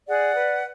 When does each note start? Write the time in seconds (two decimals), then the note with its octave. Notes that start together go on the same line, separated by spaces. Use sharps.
0.07 G#4 D5 F#5
0.34 B4